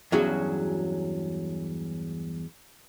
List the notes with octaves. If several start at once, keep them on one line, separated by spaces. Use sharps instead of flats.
E2 G2 F#3 C#4 F#4 G#4